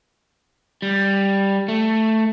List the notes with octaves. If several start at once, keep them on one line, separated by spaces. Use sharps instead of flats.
G3
A3